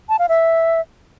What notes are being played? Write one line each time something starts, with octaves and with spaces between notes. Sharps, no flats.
A5
F5
E5